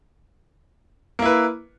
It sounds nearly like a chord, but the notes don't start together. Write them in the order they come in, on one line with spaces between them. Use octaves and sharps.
A#3 E4 B4